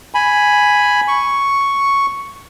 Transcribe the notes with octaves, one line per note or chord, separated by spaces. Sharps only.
G#5 B5
C#6